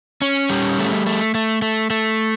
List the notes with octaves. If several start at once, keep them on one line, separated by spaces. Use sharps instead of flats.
C#4
G3
A3
A3
A3
A3
A3